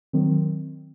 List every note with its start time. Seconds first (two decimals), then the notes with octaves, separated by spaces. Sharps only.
0.13 D#3 F#3 C4